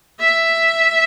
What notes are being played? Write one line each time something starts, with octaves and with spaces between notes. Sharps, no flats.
E5